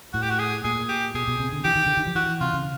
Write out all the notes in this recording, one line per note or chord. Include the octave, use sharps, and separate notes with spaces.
A2 F#4
G4
F#4
G#4
A#2 G#4
G4
B2 G#4
B2
C3
D3
E3 G4
D#3
D3
D#3
F3
E3 F#4
C3 F4
C#3